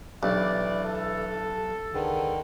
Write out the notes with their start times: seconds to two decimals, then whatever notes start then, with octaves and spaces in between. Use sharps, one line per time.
0.23 B1 E3 D4 G4 D5
0.84 A4
1.94 C#2 D3 D#3 G#4 B4